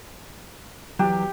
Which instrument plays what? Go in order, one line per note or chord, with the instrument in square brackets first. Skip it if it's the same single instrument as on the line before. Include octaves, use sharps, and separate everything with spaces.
[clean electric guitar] E2 F#3 [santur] G4